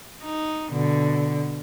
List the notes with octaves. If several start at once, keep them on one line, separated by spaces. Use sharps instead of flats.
D#4
B2 D3